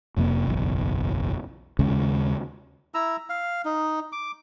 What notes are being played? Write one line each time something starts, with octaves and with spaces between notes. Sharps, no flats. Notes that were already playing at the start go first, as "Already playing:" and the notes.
F1 F2 C3 A#3
F#1 B1 E2
D#2 C#3 G#3 C#4
E4 A#5 E6
F5
D#4
D6